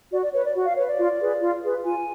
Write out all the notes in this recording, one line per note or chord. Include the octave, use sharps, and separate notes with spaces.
F#4 D5
D5
B4 C#5
D5
F#4
F5
B4 C#5
D5
F4
G#4 B4
F4
G#4 B4
F4 G#5